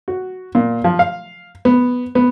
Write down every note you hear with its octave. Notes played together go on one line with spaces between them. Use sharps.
F#4
A#2
F3
F5
B3
B3